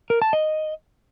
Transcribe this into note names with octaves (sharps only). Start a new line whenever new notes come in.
A#4
A5
D#5